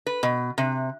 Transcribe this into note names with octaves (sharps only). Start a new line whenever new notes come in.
B4
B2
C3